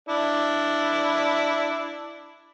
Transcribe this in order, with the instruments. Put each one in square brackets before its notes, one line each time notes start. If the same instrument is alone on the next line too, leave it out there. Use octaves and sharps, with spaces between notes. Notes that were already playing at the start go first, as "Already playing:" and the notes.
[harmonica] D4 E4